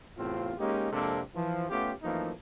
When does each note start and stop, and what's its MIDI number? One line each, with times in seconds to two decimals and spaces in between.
0.17 0.53 40
0.17 0.53 45
0.17 0.53 48
0.17 0.53 60
0.17 0.53 65
0.58 0.90 56
0.58 0.90 58
0.58 0.90 61
0.58 0.90 63
0.58 0.90 67
0.92 1.21 41
0.92 1.21 48
0.92 1.21 56
0.92 1.21 58
0.92 1.21 62
0.92 1.21 69
1.35 1.66 52
1.35 1.66 53
1.70 1.91 57
1.70 1.91 59
1.70 1.91 61
1.70 1.91 65
1.70 1.91 67
2.03 2.31 42
2.03 2.31 52
2.03 2.31 53
2.03 2.31 57
2.03 2.31 58
2.03 2.31 63